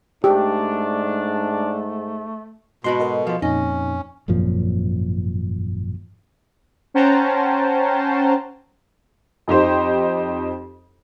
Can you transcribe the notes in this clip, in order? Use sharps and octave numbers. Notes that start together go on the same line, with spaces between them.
G#2 A3 D4 G4
G#2 B2 F#4 B5 C6
A4 A#4 D#5
F3 F4 F5
F2 A#2 C#4 D#4 D#5
G#1 F#2 A#2 F3
C#4 C5 F#5 G5 A5 A#5
F2 D#4 G4 C5